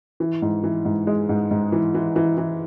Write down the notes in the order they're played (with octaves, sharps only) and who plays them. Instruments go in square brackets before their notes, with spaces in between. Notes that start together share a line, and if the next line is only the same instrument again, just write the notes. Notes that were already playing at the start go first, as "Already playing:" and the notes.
[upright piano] E3
G#2
E3
G#2
G#3
G#2
G#2
E3
E3
E3
E3